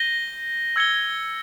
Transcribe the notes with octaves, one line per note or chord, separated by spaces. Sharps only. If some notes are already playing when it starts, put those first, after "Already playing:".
Already playing: G6 A#6 D#7 G7
E6 G#6 C#7 G7